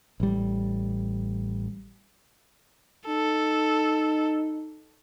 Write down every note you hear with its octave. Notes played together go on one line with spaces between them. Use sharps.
A1 G3
D#4 A4